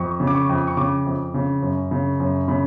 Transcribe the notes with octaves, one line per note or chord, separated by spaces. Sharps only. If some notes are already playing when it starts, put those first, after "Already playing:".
Already playing: F2 C#6
C#3
D6
C#6
F2
C#6
C#3 D6
F2
C#3
F#2
C#3
F#2
C#3 B5